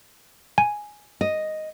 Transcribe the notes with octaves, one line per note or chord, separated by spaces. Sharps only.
G#5
D#5